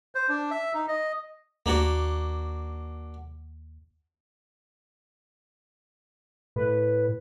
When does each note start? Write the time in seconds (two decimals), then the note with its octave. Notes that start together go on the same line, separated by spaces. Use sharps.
0.15 C5
0.29 D4
0.51 E5
0.74 D#4
0.88 D#5
1.66 D#2 A#3 D4 F#4
6.56 A2 B4